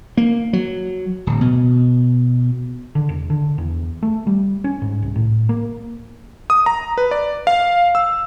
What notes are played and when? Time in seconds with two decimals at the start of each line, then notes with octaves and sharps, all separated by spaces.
0.17 A#3
0.53 F#3
1.27 D1
1.41 B2
2.95 D3
3.09 E1
3.30 D3
3.58 E2
4.03 A3
4.27 G3
4.64 C#4
4.82 G#2
5.02 C2
5.16 A2
5.49 A#3
6.50 D#6
6.66 A#5
6.98 B4
7.11 D5
7.47 F5
7.95 E6